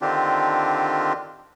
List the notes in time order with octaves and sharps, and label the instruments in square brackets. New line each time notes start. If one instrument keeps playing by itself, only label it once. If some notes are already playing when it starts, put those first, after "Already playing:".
[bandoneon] D3 D#3 C4 D4 F4 G4